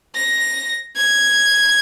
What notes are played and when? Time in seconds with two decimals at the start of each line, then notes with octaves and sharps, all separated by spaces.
0.15 A#6
0.97 G#6